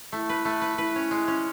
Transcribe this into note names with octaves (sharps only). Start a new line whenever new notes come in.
A3 E4
B4
A3
B4
E4 B4
C#4
G#3
C#4